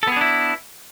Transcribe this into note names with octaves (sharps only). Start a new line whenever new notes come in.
B3 D4 E4 G#4 A4